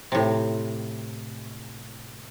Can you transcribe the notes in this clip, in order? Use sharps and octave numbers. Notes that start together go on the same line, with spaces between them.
A2 C3